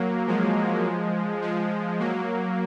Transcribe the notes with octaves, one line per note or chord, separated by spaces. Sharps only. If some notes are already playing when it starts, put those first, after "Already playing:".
Already playing: F#3 A#3
F3 G#3
F3 G#3
F#3 A#3